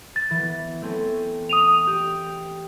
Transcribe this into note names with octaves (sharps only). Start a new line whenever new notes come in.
A6
E3 B3
A3 C4 C#4
D#6 D#7 F7
G4